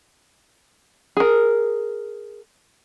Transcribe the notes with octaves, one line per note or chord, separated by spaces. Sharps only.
G#4 A#4